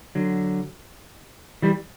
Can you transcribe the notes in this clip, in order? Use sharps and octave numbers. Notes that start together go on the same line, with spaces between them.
D3 F#3
E3 G3